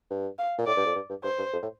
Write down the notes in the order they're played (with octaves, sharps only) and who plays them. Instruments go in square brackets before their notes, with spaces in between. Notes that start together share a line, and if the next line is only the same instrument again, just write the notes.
[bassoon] G2
[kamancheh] F5
[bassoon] A#2
[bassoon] A2 [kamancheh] D5
[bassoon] G2
F2
G2
G2
[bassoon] G2 [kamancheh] C5
[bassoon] G2
F2
A2